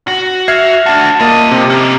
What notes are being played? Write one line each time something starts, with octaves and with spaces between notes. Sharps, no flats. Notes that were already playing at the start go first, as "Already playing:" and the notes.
F#4
E5 F6 G#6 C7
D4 F#4 A5
A#3 F4 D#5
C3 G4
A#3 C#4